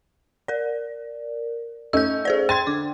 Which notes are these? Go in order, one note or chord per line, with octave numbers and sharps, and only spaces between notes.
A#4 D5
A3 C#4 D#4 E6 G6
G#4 C5 D5
G5 C6 G#6 A6
D3 D6